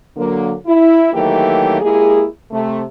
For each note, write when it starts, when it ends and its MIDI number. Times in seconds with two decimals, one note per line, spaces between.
0.16 0.53 50
0.16 0.53 54
0.16 0.53 58
0.66 1.11 64
1.13 1.79 51
1.13 1.79 52
1.13 1.79 54
1.13 1.79 57
1.13 1.79 58
1.13 1.79 67
1.81 2.24 56
1.81 2.24 58
1.81 2.24 64
1.81 2.24 67
1.81 2.24 68
2.51 2.83 48
2.51 2.83 57